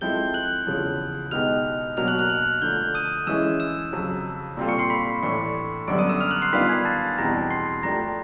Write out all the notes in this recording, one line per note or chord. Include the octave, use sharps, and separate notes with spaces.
F3 G#3 C4 E4 A4 G6 G7
F#6 F#7
E2 C#3 F3
B2 G#3 B3 D#4 G4 F6 F7
B2 F#3 A#3 D4 F#4 F6 F7
F#6 F#7
F6 F7
F#6 F#7
D3 F3 A3 D4 G6 G7
D#6 D#7
E3 G#3 C#4 E4 G#4 E6 E7
E6 E7
F2 C#3 F#3
A#2 G3 C4 F4 A4
C#6 C#7
C6 C7
B5 B6
A2 E3 A3 D4 C#6 C#7
F#2 D3 G3 B3 D4 D6 D7
D#6 D#7
E6 E7
F6 F7
F#6 F#7
C6 C7
D#3 G3 B3 D4 F4 B5 B6
G#5 G#6
A5 A6
E2 B2 G3 C4 A#5 A#6
C6 C7
F3 A3 D4 G4 A#5 A#6